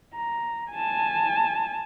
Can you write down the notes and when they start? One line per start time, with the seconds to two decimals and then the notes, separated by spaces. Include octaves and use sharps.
0.14 A#5
0.71 G#5 A5